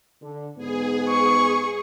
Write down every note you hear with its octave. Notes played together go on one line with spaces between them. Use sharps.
D3
G#2 B3 G#4
C#6